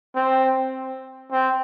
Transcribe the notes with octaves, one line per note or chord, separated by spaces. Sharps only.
C4
C4